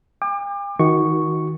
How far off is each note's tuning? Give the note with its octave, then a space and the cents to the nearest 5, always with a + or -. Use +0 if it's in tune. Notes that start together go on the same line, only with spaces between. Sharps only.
G5 +45 D6 +30
D#3 +25 F#4 +0 C#6 +0